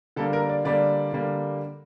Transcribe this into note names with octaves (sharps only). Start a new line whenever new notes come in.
D3 G3 A#3 A4
A#4
D5
D3 G3 A#3 D5
D3 G3 A#3